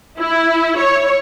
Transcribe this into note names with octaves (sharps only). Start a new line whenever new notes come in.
E4
C#5